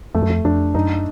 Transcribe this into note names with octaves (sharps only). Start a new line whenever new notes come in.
F2 A3
F#2
F2
F2 D4
F#2 D#4